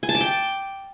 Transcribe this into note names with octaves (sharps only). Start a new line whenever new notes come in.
G#5
A5
D6
G5